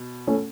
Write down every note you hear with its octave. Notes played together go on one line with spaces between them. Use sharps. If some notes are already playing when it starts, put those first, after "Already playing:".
Already playing: B2
A3 C#4